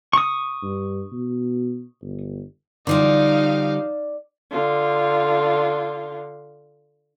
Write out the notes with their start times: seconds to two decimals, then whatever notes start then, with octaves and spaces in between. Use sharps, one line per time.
0.13 C#6 D#6
0.63 G2
1.12 B2
2.02 G1
2.87 D3 F3 G3 D#4 D5 F5
4.51 D3 F4